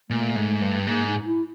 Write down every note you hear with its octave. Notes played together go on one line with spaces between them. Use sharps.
A#2 A3
G#2
G2
G#2 A#3
D#4
E4